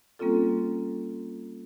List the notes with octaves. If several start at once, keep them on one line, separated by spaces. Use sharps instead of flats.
G3 A#3 C4 C#4 F4 A4